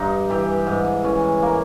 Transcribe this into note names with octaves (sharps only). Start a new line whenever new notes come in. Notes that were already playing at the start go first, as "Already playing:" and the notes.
Already playing: G2 D#4
E3 G4
G#2
E3 C#4
A#3